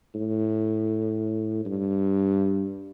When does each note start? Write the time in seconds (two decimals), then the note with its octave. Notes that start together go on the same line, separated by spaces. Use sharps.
0.15 A2
1.65 G2